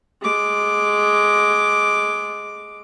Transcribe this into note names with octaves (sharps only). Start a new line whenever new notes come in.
G#3 D6